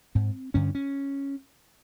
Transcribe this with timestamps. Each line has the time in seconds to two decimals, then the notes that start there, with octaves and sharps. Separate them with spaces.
0.15 G#2 C4
0.54 G2 D3 C#4
0.75 C#4